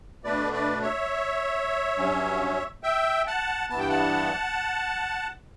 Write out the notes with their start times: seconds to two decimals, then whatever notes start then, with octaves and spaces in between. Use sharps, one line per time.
0.24 B2 A3 D4 B4 D5
0.53 B4 D5
0.82 C#5 E5
1.98 G2 F#3 C#4
2.83 E5 G5
3.27 F#5 A5
3.70 G2 E3 B3 A5
3.79 G5
3.89 F#5 A5